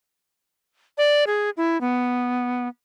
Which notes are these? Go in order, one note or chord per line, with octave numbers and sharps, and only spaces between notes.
D5
G#4
E4
B3